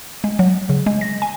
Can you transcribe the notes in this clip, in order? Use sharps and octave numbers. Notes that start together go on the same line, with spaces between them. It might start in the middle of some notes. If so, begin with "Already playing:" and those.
G#3
F#3
C#3
G#3
A#6
G#5